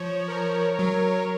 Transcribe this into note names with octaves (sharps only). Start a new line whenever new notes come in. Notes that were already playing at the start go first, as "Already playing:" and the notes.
Already playing: F3 C#5
A#4
F#3